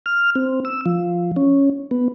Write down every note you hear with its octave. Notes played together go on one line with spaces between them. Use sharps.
F6
C4
E6
F3
C#4
B3